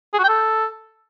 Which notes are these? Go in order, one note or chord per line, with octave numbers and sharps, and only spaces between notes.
G#4
F#4
G5
A4